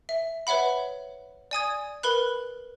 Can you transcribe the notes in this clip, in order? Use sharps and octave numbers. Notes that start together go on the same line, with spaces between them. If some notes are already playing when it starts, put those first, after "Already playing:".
E5
B4 C#5 E5 F#5 B5
D5 G#5 D#6 G#6
A#4 B4 B5 F#6